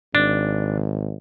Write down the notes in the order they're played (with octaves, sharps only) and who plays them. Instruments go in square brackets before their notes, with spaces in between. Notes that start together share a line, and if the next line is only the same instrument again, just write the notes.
[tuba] G#1 [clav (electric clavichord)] D4